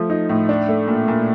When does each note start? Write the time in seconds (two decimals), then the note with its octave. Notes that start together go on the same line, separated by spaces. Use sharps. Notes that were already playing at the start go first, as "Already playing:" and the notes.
Already playing: F3 A3
0.10 D#4
0.29 A2
0.49 D4
0.68 A3
0.88 A#2
1.08 A#2